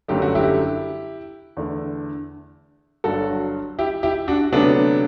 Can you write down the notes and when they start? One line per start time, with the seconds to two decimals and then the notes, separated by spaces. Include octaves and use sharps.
0.08 G1 F#2 D3 F#3 A3 G4
0.22 F#4
0.35 E4 G4
1.57 E2 D3 A3
3.04 G1 G2 F#3 F#4 A4
3.79 E4 G4
4.03 E4 G4
4.28 D4 F#4
4.52 D2 C3 F#3 A3 B3 D4